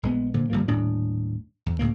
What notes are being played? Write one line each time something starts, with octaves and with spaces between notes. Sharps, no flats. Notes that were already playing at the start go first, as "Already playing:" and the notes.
A#1 G#3 B3
A#2 D3 F3
G1 G2 F3 A#3
D#1 A2 D4
E2
C#2 A2 A#3